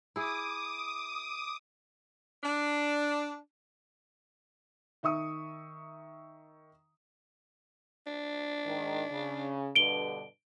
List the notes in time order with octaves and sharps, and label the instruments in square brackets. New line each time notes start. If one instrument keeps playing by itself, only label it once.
[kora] E4 G#4 [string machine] D6 D#6
[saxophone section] D4
[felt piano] D#3 E5 C#6 D#6
[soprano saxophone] D4
[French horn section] G#2 D#3
C#3
[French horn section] G2 B2 D3 [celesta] D7 G7